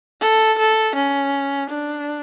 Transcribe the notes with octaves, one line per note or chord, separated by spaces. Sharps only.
A4
A4
C#4
D4